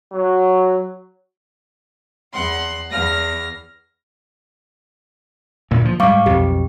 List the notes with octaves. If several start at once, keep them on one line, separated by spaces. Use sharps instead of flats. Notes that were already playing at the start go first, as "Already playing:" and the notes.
F#3
E2 F#5 C6
E2 F6 A#6
D2 A#2
F3
G#2 G3 F5 C#6 D6
B1 F2 G4